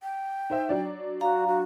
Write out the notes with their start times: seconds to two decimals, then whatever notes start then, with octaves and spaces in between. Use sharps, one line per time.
0.03 G5
0.50 D#4 C5 E5
0.69 F#3 D4 D5
1.21 F#4 F5 A#5
1.48 F#4